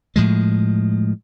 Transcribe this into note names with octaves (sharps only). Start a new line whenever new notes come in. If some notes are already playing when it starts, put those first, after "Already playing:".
A2 F3 G#3